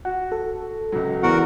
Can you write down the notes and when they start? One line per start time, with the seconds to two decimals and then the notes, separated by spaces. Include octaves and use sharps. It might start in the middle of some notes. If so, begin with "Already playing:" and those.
0.05 F#4 F#5
0.32 A4
0.92 C#2 F#3
1.23 E2 F#4 A#4 F#5